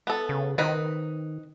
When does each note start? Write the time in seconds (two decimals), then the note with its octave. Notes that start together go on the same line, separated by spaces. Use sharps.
0.07 B3 A4
0.29 C#3
0.58 D#3 C4 D#4 B4